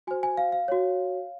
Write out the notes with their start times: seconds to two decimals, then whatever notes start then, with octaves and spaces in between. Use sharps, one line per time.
0.07 F#4 C5 G#5
0.23 G#5
0.37 F5
0.52 F5
0.68 F#4 C#5